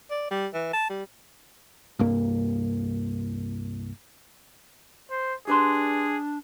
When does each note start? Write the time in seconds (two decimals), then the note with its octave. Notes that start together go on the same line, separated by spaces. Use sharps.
0.11 D5
0.31 G3
0.54 E3
0.73 A5
0.90 G3
1.99 C2 G2 A#3
5.10 C5
5.47 D4 G4 G#4 B4 C6